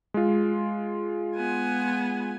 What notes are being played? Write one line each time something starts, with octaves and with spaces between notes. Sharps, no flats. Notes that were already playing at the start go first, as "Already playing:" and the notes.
G#3 F4
B3 G#5